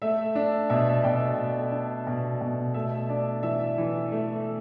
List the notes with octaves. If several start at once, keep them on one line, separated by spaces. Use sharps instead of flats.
A3 E5
D4
B2 E5
B2 D5 G5
A3
D4
B2
B2
A3 E5
D4 D5
E3 E5
E3
A3